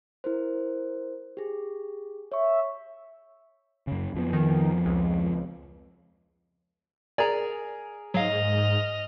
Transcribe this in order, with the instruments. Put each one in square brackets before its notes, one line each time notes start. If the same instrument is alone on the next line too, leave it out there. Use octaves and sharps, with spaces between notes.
[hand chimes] E4 A#4 C5
G4 G#4
[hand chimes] C#5 C#6 [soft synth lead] E5
[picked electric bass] F#2 C#3
F2 F3 B3
[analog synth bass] D#3
C#2
[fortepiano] G#4 A#4 G#5 [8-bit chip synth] D5 A#5
[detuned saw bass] G#2 [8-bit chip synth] F#3 F5 [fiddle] D#5 F6